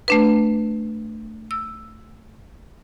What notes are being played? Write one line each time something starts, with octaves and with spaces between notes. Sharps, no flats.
A3 D4 B4
E6